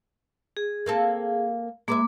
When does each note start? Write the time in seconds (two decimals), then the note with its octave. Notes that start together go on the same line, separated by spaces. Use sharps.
0.57 G#4
0.86 A#3 C4 A4
1.88 G#3 A#3 B4 E5 D6